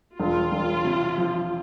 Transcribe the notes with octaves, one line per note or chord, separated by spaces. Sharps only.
E1 F4
E1
C3
F3